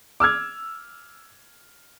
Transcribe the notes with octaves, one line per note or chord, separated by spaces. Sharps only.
D6 E6 F6 G#6